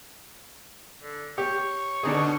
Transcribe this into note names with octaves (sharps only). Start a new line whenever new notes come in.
D3
G4 C#5
B2 D3 D4 D#4 G#4